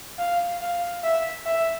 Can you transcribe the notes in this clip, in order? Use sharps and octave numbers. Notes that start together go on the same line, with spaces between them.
F5
F5
E5
E5